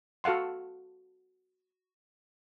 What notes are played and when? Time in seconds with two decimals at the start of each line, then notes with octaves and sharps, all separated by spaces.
0.24 F#4 A4 F5 F#5 C6